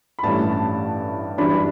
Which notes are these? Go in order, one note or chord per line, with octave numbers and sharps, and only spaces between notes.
B5
A1 G2 E3 A3 C#4 A5
A5
F#2 E3 G3 D4 B5